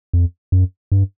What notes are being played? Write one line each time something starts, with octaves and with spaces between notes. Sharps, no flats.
F2
F#2
G2